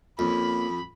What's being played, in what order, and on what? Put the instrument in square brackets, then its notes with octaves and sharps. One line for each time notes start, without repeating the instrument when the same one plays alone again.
[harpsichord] F2 [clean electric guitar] F3 A#3 C#4 [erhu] B5